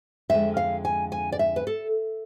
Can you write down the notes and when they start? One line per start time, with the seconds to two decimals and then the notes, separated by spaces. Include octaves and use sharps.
0.29 F2 D3 G#3 E5
0.57 F5
0.85 G#5
1.12 G#5
1.32 D5
1.39 E5
1.56 B4
1.67 A4